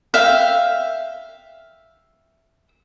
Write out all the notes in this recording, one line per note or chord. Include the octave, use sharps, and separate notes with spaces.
E5 F5 G5